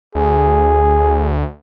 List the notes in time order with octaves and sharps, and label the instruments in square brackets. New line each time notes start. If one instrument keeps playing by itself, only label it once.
[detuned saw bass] D2 [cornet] G#4